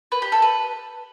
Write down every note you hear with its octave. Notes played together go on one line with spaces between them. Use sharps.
B4
G4
A4
B4